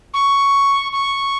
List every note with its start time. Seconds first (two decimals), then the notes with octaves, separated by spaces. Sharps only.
0.14 C#6
0.92 C#6